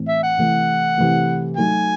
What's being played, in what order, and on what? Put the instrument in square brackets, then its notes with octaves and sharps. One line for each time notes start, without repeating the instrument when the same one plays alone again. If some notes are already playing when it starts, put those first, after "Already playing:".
Already playing: [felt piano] A2 E3 C4
[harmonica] E5
F#5
[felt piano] C3 E3 A3
C3 E3 A3
[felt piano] F#3 A3 D#4 F#4 [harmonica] G#5